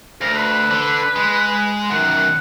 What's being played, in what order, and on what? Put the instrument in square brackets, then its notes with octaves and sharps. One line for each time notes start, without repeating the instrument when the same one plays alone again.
[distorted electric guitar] D2 [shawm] A#4
[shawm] B4
[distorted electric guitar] D3
G#3
[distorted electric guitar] F#2 D#3 [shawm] F#5